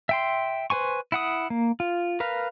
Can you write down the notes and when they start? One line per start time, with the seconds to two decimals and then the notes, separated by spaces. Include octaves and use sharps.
0.09 E5 G5 C6
0.70 B4 C5 G#5 C#6
1.12 E4 F#5 D#6
1.50 A#3
1.80 F4
2.20 A#4 B4 F5